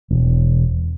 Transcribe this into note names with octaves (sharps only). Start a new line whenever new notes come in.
E1